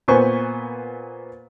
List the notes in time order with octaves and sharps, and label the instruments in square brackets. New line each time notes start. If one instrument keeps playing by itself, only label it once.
[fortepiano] A#2 B3 B4 C5 G#5 C#6